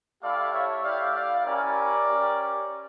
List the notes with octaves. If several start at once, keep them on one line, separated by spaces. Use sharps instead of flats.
A3 E4 G4 D5 F5
C#5 E5
A3 E4 G4 D5 F5
D5 F5
C#4 E4 G4 A#4 D5
C#4 G4